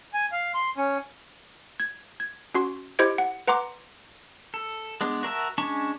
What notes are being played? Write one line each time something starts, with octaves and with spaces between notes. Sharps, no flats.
G#5
F5
C6
C#4
G#6
G#6
C#4 F#4 C6
E4 G4 C5 D#5 G#6 D7
F#5
B4 F#5 A#5 C6 D6
A4
G#3 B3 D4
F#4 A#4 E5 A5
G#3 C#4 D4 A5 C#6